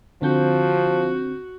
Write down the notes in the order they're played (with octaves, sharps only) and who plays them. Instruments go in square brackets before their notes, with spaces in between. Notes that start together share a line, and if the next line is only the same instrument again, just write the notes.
[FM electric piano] D3 C4 G6 [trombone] F3 [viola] F#4